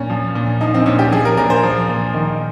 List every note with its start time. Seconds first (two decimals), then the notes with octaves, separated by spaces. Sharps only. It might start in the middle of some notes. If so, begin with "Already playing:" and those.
Already playing: A#2 C#4
0.10 F3
0.35 A#2
0.61 F3 D#4
0.74 C4
0.86 A#2 C#4
0.99 G4
1.12 F3 G#4
1.25 A#4
1.37 A#2 A#4
1.50 C5
1.63 F3
1.88 A#2
2.13 D#3